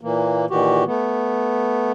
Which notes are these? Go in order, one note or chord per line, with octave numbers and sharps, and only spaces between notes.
A#2 E3 A#3
A#2 D#3 E3 F#4 G4
A3 B3